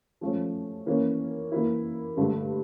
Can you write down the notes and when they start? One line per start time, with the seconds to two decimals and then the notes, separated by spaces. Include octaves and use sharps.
0.21 F3 A3 C#4
0.86 E3 A#3 C#4
1.52 E3 A#3 E4
2.17 G2 D3 A3